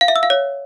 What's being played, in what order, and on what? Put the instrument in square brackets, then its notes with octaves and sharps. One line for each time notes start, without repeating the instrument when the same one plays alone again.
[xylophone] F5
E5
E6
F5
C#5